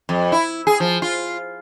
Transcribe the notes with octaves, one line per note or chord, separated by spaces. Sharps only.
F2
E4
G#4
F3
F4